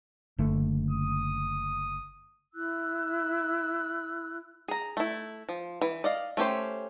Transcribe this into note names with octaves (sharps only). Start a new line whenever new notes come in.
F#1 D3 A3
D#6
E4 E6 F#6
G#4 A#5
A3 E4
F3
E3
D5 D#5 F5
A3 C#4 G4 C5